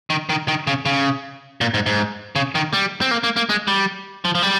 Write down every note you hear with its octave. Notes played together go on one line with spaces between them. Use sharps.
D#3
D#3
D#3
C#3
C#3
A#2
G#2
G#2
C#3
D#3
G3
C4
A#3
A#3
A#3
G#3
G3
F3
F3
G3